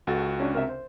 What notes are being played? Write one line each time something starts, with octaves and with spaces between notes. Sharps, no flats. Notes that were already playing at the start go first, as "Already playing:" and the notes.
C#2 F#4 A4 A6
C#4 D4
C3 A#4 E5
C5